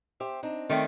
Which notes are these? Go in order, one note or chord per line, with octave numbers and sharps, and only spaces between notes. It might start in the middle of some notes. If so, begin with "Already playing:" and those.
G4 C5 E5
C4 D4 D#4
D#3 A3 C4 D5